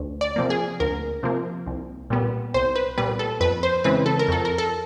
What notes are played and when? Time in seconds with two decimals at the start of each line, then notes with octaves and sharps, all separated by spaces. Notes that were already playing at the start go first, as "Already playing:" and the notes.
Already playing: D2
0.21 D5
0.36 C3 F3 A#3
0.50 G#4
0.80 D2 A#4
1.23 C3 F3 A#3
1.67 C2
2.10 A#2 G3 B3
2.54 C2 C5
2.76 B4
2.98 A#2 G3 B3 B4
3.19 A4
3.40 F2 B4
3.63 C5
3.84 C#3 E3 G#3 C4 B4
4.06 A4
4.19 A#4
4.28 F2 A4
4.45 A#4
4.58 A4